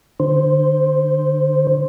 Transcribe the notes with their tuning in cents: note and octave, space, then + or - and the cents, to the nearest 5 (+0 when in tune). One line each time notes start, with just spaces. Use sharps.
D3 +30 C5 +0